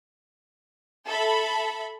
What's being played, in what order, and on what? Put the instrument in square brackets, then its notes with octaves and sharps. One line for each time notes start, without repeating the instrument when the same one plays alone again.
[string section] A4 E5 B5